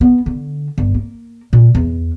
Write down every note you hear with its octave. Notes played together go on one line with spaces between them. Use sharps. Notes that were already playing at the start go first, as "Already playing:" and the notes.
B3
D3
G1
A#3
A#2
E2